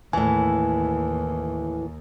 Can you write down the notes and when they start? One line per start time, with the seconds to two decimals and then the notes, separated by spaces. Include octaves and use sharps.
0.13 D#2 A2 E3 G#5